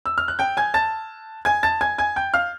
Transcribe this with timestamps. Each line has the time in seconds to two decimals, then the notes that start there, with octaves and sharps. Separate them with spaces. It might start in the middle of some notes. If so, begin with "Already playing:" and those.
0.06 E6
0.18 F6
0.28 F#6
0.39 G5 G6
0.57 G#5 G#6
0.74 A5 A6
1.45 G#5 G#6
1.63 A5 A6
1.81 G#5 G#6
1.98 G#5 G#6
2.16 G5 G6
2.34 F5 F6